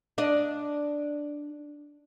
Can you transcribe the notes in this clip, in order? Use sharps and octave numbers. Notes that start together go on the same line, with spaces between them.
D4 D#5